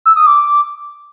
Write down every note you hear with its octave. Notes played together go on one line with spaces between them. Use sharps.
E6
D#6
D6